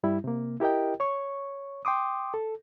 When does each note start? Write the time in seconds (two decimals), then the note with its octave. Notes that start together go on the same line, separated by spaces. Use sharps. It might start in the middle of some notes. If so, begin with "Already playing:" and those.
0.03 G2 G3 E4
0.24 C3 A#3
0.60 E4 G4 A#4 D#5 G5
1.00 C#5 C#6
1.85 G5 C6 D6 D#6
2.34 A4